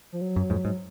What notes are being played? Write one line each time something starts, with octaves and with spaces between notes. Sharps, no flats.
F3
F#3
F#2
F2 G#2
G#2